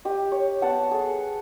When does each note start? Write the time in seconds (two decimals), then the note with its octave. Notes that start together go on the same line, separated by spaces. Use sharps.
0.05 G4 D#5
0.32 C#5
0.62 B3 F#5 A5
0.91 G#4 A4